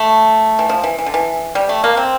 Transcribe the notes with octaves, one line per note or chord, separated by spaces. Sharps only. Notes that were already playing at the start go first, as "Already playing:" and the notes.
Already playing: A3
E3
F3
E3
E3
D3
E3
G3
A3
A#3
C4